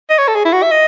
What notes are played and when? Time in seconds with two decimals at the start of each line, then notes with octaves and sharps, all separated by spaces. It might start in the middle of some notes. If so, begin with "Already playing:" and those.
0.10 D#5
0.18 C#5
0.28 A4
0.35 G#4
0.45 E4
0.53 F#4
0.63 E5
0.72 D#5